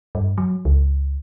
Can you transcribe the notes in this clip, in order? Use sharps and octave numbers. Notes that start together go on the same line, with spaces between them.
G2
F#3
C#2